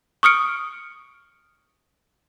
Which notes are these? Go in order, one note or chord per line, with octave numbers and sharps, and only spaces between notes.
C#6 D#6 F6 C#7 D7